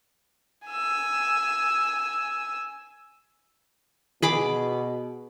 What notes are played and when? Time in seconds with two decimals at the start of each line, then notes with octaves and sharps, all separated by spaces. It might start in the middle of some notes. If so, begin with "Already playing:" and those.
0.68 G#5 E6
4.22 B2 G#4 B5 D6